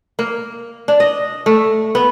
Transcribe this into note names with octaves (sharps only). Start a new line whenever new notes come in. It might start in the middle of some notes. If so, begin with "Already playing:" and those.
A#3
D4
D#5
A3
B3